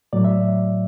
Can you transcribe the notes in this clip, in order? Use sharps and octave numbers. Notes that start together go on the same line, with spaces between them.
A2 F#3 D5
E5